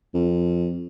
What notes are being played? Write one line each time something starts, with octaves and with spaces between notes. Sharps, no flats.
F2